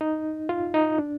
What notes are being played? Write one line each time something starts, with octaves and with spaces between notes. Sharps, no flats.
D#4
F4
D#4
D4